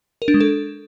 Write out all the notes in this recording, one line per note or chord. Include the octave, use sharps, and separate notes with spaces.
A#4
D4
G#3
A4